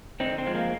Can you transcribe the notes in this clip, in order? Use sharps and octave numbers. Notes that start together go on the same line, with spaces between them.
D3 C4 D#4
C4
F3 G#3
A#3